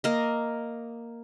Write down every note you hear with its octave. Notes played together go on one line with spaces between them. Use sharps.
A#3 D#5